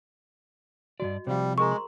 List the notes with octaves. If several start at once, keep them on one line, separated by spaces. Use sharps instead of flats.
G2 E3 F#4 D5 D#5
C3 F3 G3 C5 F5
G#3 G#4 A#4 A#5 C#6
C6